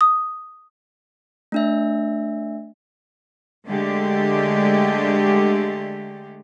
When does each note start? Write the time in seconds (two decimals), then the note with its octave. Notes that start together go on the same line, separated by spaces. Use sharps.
0.01 D#6
1.52 A3 D4 E5
3.68 D3 G#3 A3 G4